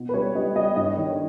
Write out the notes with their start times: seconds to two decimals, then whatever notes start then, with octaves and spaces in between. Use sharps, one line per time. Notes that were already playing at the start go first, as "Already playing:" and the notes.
Already playing: B2
0.09 B4
0.14 G3 C#5
0.35 G3 D#5
0.56 G3 D#5
0.76 G2 D#5
0.97 D#3 C#5